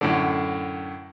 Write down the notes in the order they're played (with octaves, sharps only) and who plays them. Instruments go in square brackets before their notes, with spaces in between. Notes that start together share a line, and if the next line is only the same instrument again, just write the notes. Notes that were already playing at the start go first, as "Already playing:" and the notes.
[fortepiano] F#2 A2 D3